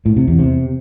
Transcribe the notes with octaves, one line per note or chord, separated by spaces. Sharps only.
A2
C3
E2
C3